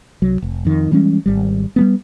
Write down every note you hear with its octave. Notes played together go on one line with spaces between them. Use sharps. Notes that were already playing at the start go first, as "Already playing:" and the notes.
C2 F#3
F1
F2 D#3
E3 G3 G#3 C#4
G#1 G3
G3 A3 B3